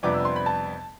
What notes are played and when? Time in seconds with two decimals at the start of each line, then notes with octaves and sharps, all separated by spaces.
0.03 F2 C3 G3 B3 D4 D6
0.14 E6
0.25 C6
0.36 B5
0.46 A5